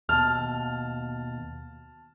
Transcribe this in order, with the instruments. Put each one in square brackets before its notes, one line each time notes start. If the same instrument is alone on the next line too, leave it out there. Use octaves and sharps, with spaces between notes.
[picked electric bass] D#2 B2 [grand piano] A5 F6